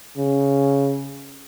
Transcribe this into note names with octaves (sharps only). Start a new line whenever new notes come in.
C#3